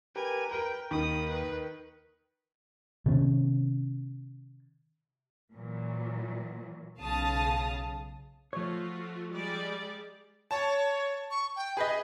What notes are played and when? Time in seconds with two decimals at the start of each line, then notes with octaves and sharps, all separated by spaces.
0.16 G4 A#4 B4 G#5
0.51 A#4 B4 G5
0.91 D#2 D#3 B5 D#6
1.28 B4
3.06 C3 D#3 B3 C#4
5.53 A#2 E3 F#3
6.98 B1 C#3 F5 A5 D#6
8.53 F3 A3 F4 F#4 C#5
9.31 G3 G#3 D5
10.51 C#5 A5
11.30 C#6
11.56 G5
11.77 G#4 B4 D#5